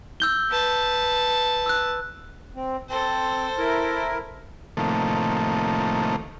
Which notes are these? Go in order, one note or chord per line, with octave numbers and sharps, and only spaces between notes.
E6 G6 G7
B4 A5
E6 F#6
C4
C4 A4 C5
E4 A#4
A2 C3 D#3 F3 A3 A#3